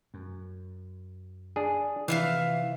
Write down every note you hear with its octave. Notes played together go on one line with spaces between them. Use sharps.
F#2
D4 G#4
C3 E3 F3 F4 E5 F5